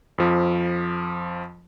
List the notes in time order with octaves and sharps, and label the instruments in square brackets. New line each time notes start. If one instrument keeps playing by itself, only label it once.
[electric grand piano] F2 F3